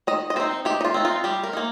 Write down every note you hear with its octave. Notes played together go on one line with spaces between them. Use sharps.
D#3 D#5
D#5
C4 D#4 C5
D#3 G4
D#4
F4
C4 D#4
F4
G3 G4
A#4
D#4
A#3